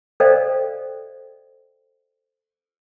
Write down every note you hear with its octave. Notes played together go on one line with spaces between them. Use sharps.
A4 C5 D5 D#5 F5 G5